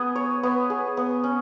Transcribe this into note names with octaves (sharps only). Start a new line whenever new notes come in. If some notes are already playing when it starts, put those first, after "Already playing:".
Already playing: B3 G#4
C#5
B3
G#4
B3
C#4